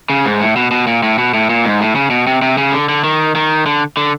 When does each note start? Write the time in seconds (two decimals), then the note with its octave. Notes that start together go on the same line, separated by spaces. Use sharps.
0.10 C#3
0.26 G#2
0.40 A2
0.56 B2
0.71 B2
0.87 A#2
1.03 A2
1.18 B2
1.34 A2
1.50 A#2
1.65 G#2
1.80 A2
1.95 C#3
2.10 B2
2.27 C3
2.42 C3
2.58 C#3
2.72 D3
2.89 D3
3.04 D#3
3.35 D#3
3.66 D3
3.97 D3